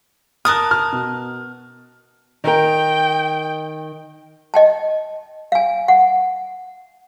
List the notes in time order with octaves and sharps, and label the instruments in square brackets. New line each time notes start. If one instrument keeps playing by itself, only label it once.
[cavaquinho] A#4 A5 D#6 [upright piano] F6 F#6
[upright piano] F6
B2
[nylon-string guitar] D#3 A#4 [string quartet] G5
[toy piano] D#5 G5 A5
F5 G#5
F#5